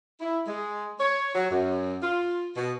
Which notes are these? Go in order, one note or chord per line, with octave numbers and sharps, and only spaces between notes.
E4
G#3
C#5
F#3
F#2
F4
B2